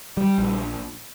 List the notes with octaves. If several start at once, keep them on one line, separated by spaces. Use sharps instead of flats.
G3
A#1